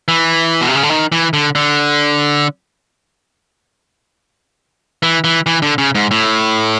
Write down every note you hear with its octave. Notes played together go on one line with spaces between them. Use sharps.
E3
B2
C3
C#3
D3
D#3
E3
D3
D3
E3
E3
E3
D3
C#3
G#2
A2